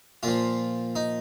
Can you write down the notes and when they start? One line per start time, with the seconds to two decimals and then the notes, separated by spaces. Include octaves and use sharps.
0.23 A#2 F3 F4
0.96 D#4